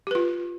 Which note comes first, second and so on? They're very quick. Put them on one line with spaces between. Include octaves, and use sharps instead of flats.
G4 B4 F4